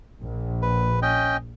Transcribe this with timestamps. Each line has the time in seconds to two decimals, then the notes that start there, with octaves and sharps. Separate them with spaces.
0.21 A#1
0.62 B4
1.02 C#4 D#5 G5